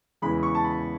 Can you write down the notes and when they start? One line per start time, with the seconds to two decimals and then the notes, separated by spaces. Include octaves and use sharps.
0.22 E2 C#3 E3 G#3 B5
0.43 C#6
0.55 A5
0.64 B5